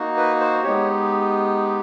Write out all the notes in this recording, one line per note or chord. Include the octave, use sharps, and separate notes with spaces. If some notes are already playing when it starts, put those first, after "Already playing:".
Already playing: A#3 D#4 F#4
B4
C5
G#3 B3 D#4 G4 C#5